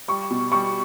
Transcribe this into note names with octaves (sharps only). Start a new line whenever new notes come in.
G3 C#6
B2
G3 C#6